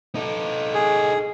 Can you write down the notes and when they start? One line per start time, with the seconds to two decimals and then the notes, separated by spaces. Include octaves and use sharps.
0.15 D#4 A4
0.74 G#4